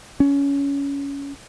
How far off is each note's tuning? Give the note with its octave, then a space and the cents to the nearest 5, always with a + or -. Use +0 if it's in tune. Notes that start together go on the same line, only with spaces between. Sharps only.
C#4 +20